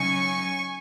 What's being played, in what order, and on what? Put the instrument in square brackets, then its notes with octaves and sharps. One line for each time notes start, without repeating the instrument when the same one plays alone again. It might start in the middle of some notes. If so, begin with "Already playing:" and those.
Already playing: [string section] C#3 F#3 D#4 G#5 C#6